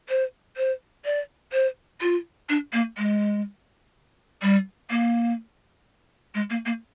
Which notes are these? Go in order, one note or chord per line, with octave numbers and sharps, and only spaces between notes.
C5
C5
D5
C5
F4
D4
A#3
G#3
G3
A#3
G#3
A#3
A#3